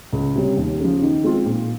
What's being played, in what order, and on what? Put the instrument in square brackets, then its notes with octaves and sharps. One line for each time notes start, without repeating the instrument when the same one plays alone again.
[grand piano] C#2
C3 G3 C#4
D#2
C#3 F3
D#3
G#3 C4 F4
A#2